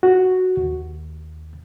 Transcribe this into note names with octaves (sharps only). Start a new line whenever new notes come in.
F#4
D#2